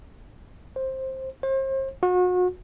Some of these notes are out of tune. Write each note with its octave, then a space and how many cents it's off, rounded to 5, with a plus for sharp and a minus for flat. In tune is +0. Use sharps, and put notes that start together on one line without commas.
C5 +15
C5 +40
F#4 -35